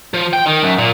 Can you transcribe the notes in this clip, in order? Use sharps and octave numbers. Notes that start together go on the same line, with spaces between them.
F3
G5
D#3
F#2
A#2